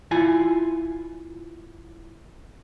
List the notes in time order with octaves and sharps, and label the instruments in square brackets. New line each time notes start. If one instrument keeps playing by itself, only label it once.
[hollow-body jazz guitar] E4 F4 G#5